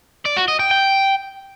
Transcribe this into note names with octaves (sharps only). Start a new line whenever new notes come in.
D5
F#4
D#5
G5
G5